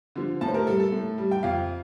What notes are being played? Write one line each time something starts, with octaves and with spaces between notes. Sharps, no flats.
D3 F3
A2 A5
C5
A#4
G3 A4
A4
A2
G3
G5
F2 F5